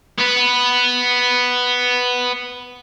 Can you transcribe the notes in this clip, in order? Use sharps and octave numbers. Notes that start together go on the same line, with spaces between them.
B3 B4